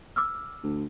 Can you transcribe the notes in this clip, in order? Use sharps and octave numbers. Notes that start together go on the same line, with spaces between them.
D6 E6 F6
D2